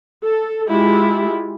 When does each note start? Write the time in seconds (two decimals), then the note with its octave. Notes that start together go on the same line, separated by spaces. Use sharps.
0.25 A4
0.67 G#3 E4 F4 G4